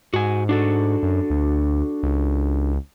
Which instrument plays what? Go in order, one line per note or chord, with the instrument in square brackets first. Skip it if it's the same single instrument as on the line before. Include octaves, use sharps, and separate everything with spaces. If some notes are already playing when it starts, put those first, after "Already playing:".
[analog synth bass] G#2 [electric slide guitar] F#4 G#5
[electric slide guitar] D4 F#4 A4
[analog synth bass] F#2
D2
C#2